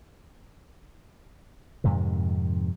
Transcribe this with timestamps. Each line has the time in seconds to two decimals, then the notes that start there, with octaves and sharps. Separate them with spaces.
1.84 F2 G#2 C3 D#3